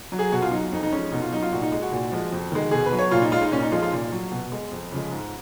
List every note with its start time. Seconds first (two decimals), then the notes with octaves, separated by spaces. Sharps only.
0.12 F#3
0.19 G#4
0.32 B2 F#4
0.42 F4
0.52 F#3 D#4
0.72 F2 D#4
0.83 D#4
0.92 F3 G#3 C#4
1.12 B2 D#4
1.22 F4
1.32 F#3 D#4
1.42 F4
1.52 A#2 F#4
1.62 D#4
1.72 G#3
1.82 F#4
1.92 A#2
2.12 F3 G#3
2.32 F2
2.52 D#3 G#3
2.71 B2 G#4
2.86 B4
2.92 F#3
2.99 C#5
3.11 A#2 F4
3.22 D#4
3.32 G#3 F4
3.42 D#4
3.51 A#2 C#4
3.62 D#4
3.71 F3 G#3 F4
3.82 F4
3.92 A#2
4.11 F#3
4.32 B2
4.52 G#3
4.71 F2
4.92 C#3 F3 G#3
5.11 G#2